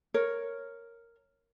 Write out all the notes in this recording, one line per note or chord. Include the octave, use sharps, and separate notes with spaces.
A#4 C#5